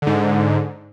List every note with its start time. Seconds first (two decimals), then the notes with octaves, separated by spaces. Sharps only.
0.02 G#2 D3